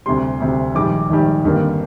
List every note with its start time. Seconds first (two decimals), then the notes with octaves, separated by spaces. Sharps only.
0.06 D2 C3 G3 C6
0.40 D2 C3 G3
0.75 A#1 G#2 D#3 G3 D6
1.10 A#1 G#2 D#3 G3
1.44 G#1 G2 D3 G3 A#3